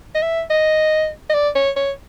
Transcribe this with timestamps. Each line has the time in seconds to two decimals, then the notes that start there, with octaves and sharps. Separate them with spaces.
0.15 D#5
0.22 E5
0.51 D#5
1.30 D#5
1.34 D5
1.55 C#5
1.77 C#5